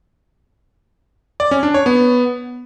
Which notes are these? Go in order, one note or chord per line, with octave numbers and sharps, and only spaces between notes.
D5
C#4
D4
C#5
B3